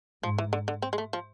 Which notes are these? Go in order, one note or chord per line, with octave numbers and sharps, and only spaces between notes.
G#2 F3
E3
D3
D3
C4
G#3
A3
F3